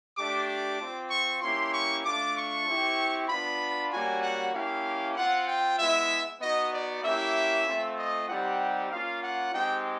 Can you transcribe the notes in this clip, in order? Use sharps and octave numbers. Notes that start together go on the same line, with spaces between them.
A3 D4 G4 D6
D6
C4 F4
C#6
A#3 C#4 E4 G4 C6
C#6
A3 D4 F4 D6
C#6
C4 E4 G4
B3 D4 F4 B5
G3 A#3 C#4 F#4 G#5
F#5
A#3 C#4 E4 G4 F5
C4 F4 F#5
G5
G#3 B3 E4 E5
B3 D#4 F#4 D#5
D5
A#3 C#4 E4 G4 E5
A3 C4 F4
D#5
G3 C4 D#4 G4 F#5
A#3 C#4 F4 F5
F#5
G#3 C4 D#4 G4 G5